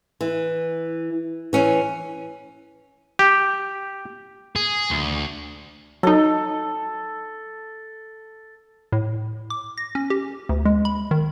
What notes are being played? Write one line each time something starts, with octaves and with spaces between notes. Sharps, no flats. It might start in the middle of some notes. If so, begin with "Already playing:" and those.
E3
E3 C#4
G4
G#4
D2
F#3 D#4 A4
A2
D6
A#6
C#4
G4
D2
G#3
B5
D#3